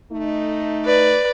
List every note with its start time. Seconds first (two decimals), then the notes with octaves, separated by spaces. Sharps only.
0.12 A3 D#4
0.85 B4 D5